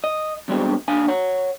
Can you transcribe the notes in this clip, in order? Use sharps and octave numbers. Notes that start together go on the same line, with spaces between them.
D#5
E2 G2 B2 D3 G#3 C4
D#2 D4 F5 G#5
C#5 F#5